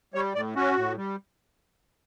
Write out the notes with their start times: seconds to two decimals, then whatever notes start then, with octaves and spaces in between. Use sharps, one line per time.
0.14 G3 C#5
0.35 A2 D5
0.55 C#4 F#4
0.76 A2
0.97 G3